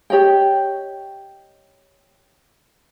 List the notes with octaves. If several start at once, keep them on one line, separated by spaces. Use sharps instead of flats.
G4 C#5 D#5 G5